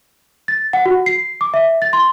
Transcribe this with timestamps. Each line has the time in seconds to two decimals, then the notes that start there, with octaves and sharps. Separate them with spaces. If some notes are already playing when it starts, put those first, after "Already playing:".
0.48 A6
0.73 F#5
0.86 F#4
1.06 C7
1.41 D6
1.54 E5
1.82 A6
1.93 C6